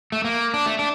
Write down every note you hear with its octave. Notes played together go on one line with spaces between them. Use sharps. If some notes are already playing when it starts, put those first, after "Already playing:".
A3
A#3
D4
A3
D4